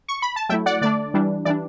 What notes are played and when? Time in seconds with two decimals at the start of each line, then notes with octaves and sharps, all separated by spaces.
0.08 C#6
0.22 B5
0.36 A5
0.49 F#3 A3 E4 E5 G5
0.66 D5 F#5
0.81 D3 A3 D4 D5
1.14 E3 G3 D4
1.45 E3 G3 D4 D5